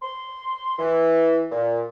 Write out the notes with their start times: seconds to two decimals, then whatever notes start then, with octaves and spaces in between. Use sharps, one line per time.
0.01 C6
0.78 E3
1.52 A#2